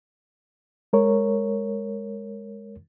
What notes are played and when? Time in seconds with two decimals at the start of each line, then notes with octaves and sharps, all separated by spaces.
0.93 G#3 A#4 C#5